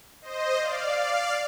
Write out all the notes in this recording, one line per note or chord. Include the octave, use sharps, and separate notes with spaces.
C5 D#5
D5 F5
D5 F5